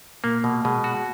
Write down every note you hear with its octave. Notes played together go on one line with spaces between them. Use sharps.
A#2 A#3
B2
B2 G#3
F#4